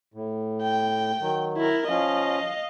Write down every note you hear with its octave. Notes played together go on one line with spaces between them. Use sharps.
A2
G5
D#3 F#3
E4 A#4
F3 C#4 D#5 F5